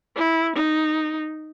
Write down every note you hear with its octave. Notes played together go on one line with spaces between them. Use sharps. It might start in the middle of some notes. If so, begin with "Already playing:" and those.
E4
D#4